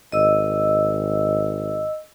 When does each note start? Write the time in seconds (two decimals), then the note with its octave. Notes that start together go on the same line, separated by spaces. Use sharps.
0.12 G#1 D#5 E6